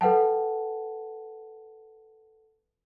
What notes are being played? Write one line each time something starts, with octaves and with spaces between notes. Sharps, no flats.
A4 B4 F#5 G5 A5